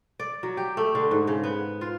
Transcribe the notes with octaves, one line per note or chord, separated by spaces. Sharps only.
D5
F#3
G4
A3
D3
G#2
C#3
B3
F4